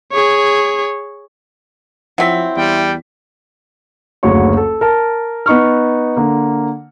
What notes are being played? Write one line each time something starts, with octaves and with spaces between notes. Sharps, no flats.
G#4 C#5
F3 F#3 C4 E4 B6
E2 G3 G5
F#1 D2 F#3 C#5 C#6
A4
A#4 A5
B3 D#4 C#6 F6
D3 A#3